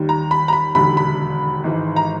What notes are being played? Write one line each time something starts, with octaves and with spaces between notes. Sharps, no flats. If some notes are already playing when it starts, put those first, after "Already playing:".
Already playing: D#2 D#3 G3
A#5
B5
A#5
B5
E1 D#2 D3 B5
B5
G#1 G#2 E3
A#5